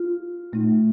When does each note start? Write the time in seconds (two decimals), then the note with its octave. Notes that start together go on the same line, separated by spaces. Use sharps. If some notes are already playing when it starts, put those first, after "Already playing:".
Already playing: F4
0.53 A#2 A3 D#4